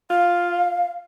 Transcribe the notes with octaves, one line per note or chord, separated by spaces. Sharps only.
F4 F5